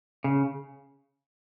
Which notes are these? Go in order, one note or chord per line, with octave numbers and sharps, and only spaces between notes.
C#3